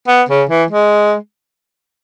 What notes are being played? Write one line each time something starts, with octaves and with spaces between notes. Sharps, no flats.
B3
C#3
E3
G#3